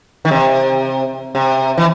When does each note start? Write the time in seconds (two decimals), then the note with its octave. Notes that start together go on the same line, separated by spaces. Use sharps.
0.25 D#3
0.31 C3
1.35 C3
1.78 E3